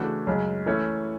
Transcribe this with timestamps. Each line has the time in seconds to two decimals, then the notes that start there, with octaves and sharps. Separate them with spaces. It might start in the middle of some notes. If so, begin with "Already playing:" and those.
Already playing: C#3 E3 A3 D4 F#4
0.27 F#2 C#3 G#3
0.66 E3 A3 C#4 E4